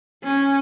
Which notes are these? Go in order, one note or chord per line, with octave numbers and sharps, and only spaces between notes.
C#4